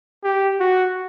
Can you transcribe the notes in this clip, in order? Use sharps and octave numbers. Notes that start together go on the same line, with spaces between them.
G4
F#4